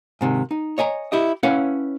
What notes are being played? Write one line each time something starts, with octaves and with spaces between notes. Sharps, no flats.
G#2 C3 D#3
D#4
C#5 D#5 G#5 A#5
E4 G4 D#5
C#4 E4 B4 C#5 F5 F#5